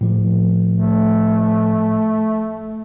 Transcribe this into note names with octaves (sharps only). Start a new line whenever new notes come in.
A2 F3
A3